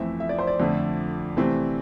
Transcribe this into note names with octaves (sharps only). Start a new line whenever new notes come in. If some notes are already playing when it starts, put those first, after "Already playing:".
Already playing: F2 E3 A3 C4 E5
E5
D5
C5
D5
F2 D3 A3
C3 E3 A3 C4